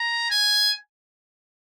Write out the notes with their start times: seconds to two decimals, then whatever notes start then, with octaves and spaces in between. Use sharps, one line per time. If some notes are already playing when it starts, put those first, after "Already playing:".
Already playing: A#5
0.30 G#5